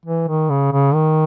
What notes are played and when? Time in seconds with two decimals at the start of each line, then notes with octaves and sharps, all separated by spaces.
0.05 E3
0.28 D#3
0.50 C#3
0.72 C#3
0.94 D#3